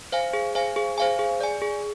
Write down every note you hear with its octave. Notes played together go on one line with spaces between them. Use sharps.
C5 F5 G#5
G#4
C5 F5 G#5
G#4
C5 F5 G#5
G#4
D5 G#5
G#4